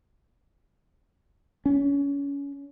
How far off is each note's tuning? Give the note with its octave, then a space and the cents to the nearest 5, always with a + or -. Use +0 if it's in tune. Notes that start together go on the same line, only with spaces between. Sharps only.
C#4 +25